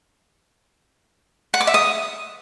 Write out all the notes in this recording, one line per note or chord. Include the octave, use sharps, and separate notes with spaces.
F#5
D6
E5
D#6